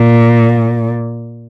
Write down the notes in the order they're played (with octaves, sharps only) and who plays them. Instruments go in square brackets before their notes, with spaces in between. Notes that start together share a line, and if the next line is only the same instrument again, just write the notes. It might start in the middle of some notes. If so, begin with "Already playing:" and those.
Already playing: [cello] A#2